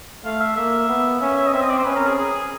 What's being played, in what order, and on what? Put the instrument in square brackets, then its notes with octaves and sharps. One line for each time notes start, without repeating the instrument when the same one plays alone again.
[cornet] A3 [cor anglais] F5
[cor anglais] E5
[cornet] A#3 [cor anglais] E5
[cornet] B3
[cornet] C#4 [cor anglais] E5
[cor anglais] E5
D#5
[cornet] C4 [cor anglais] E5
[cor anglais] D#5
D5
C5
[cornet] C#4 [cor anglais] B4
[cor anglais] A#4
G#4
G#4